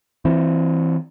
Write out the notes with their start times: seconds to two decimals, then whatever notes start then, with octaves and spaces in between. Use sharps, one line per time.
0.25 E3 C4